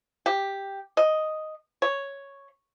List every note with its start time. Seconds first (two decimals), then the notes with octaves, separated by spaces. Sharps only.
0.26 G4
0.97 D#5
1.82 C#5